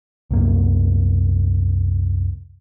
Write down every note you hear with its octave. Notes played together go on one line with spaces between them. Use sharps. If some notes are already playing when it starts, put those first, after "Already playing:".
C2 F#2 A#3